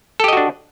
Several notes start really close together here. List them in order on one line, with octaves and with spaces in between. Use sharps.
A4 G4 D#5 F#4 D4